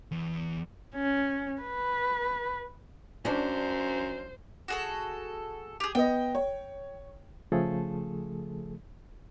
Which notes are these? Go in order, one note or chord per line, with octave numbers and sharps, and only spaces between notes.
E2
C#4
B4
F#2 C#4 D4 C5
F#4 G#4 A4
G4 G#4
B3 D#5 G5
C#5
C#3 F3 A3 G#4 A4